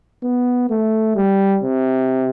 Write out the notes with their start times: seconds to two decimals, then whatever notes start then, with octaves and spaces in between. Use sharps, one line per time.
0.23 B3
0.70 A3
1.16 G3
1.63 C3